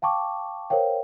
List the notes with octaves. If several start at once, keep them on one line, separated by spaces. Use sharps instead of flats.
F5 G5 A5 C#6 D6
A#4 C5 C#5 F5 G5